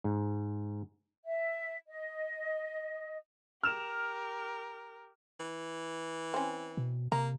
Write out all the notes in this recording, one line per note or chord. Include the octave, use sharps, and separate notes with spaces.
G#2
E5
D#5
G4 A#4 F6 E7
E3
C4 C#4
B2
C3 A#3 A#5